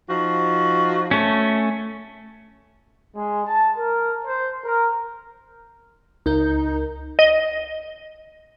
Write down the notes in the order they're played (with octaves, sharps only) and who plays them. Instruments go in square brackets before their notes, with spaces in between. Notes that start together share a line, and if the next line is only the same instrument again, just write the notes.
[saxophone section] F3 D#4 F#4
[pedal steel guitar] A3 C#4
[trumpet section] G#3
A5
A#4
C5
A#4
[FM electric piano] C#2 A#4 G6 [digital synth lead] D#4
[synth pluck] D#5